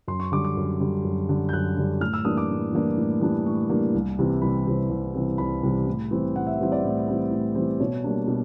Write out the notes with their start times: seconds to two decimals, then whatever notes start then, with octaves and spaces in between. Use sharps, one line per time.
0.08 F#2 C6
0.20 C#6
0.32 D3 G3 D6
0.45 D6
0.57 F#2
0.80 D3 G3
1.05 F#2
1.29 D3 G3
1.49 G6
1.53 F#2 F#6
1.77 D3 G3
2.01 A2 F6
2.14 E6
2.25 E3 G3 A#3 D4 D#6
2.37 D6
2.50 A2
2.73 E3 G3 A#3 D4
2.98 A2
3.21 E3 G3 A#3 D4
3.46 A2 C#6
3.69 E3 G3 A#3 D4
3.94 C2
4.19 C3 E3 G3 C4
4.42 C2 B5
4.67 C3 E3 G3 C4
4.90 C2
5.14 C3 E3 G3 C4
5.38 C2 B5
5.63 C3 E3 G3 C4
5.87 A2
6.11 E3 G3 C4
6.35 A2 F#5
6.47 E5
6.60 E3 G3 C4
6.72 D5
6.84 A2
7.08 E3 G3 C4
7.31 A2
7.55 E3 G3 C4
7.80 B2 C#5
8.04 G3 A#3 D4
8.28 B2